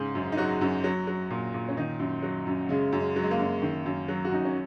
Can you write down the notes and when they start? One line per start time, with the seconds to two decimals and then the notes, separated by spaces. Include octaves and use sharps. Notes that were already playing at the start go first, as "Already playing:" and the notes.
Already playing: G#2 C#3 G#4
0.15 F#2
0.32 D#4
0.37 F#3 F#4
0.61 F#2
0.84 F#3
1.07 F#3
1.31 A#2
1.54 A#2
1.69 C#4
1.77 D#3 D#4
1.99 F#2
2.23 F#3
2.47 F#2
2.69 C#3 G#3
2.92 F#2
3.00 G#3
3.16 F#3
3.23 G#3
3.31 A#3
3.39 F#2
3.62 D#3
3.86 F#2
4.08 F#3
4.25 F#4
4.32 F#2 D#4
4.45 C#4